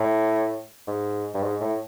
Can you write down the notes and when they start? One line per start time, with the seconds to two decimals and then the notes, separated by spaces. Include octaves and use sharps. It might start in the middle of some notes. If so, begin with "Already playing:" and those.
Already playing: A2
0.87 G#2
1.34 G2
1.43 G#2
1.61 A2